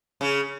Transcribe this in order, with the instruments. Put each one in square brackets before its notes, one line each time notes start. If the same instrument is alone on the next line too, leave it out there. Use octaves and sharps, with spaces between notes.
[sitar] C#3